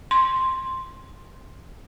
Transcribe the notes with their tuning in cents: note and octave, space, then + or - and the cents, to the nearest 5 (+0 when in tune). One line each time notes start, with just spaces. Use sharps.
C6 +0